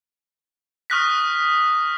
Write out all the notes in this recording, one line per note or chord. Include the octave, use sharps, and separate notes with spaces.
C#6 D#6 F6 F#6 A#6 B6